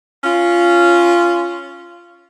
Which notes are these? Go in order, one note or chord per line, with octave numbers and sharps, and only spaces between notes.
C#4 F4